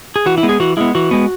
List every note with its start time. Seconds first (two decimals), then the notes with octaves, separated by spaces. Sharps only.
0.16 G#4
0.26 E3 F#4
0.38 E4
0.43 G#3 B3
0.49 G#4
0.60 E3 F#4
0.77 G#3 B3 E4
0.95 E3 F#4
1.11 G#3 B3